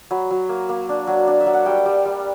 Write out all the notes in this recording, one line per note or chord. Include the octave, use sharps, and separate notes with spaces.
F#3 B5
F#3
A#3
A#3
D4
F#3
D4
E5
F#3
F#5
G3 G5
G3
G3